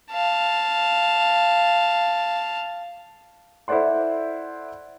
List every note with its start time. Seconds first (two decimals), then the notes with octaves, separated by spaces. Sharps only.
0.11 F5 A5
3.68 E4 A4 C5 D5 F#5 C6